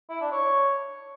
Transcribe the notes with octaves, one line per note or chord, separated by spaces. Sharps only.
E4
D4
C#5